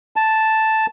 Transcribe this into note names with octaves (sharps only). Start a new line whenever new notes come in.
A5